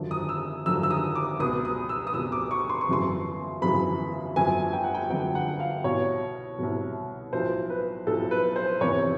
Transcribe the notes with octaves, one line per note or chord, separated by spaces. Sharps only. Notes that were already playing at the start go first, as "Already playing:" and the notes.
Already playing: G#1 F#2 D3 F3
D#6
E6
G#1 F#2 D3 F3 E6
E6
D#6
D6
C#2 B2 D#6
D#6
E6
D#6
C#2 B2 E6
D6
C#6
C6
C#6
G1 F#2 C#3 E3 C6
G1 F#2 C#3 E3 B5
G1 F#2 D3 F3 G#5
G5
F#5
G5
G1 F#2 D3 F3 G5
F#5
F5
C2 B2 C#5
C2 B2
B1 A2 F3 C5
B4
B1 A2 F3 A4
B4
C5
F1 E2 C3 C#5